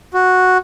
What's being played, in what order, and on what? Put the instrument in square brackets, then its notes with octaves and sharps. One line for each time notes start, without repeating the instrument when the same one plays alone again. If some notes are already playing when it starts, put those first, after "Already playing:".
[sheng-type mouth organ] F#4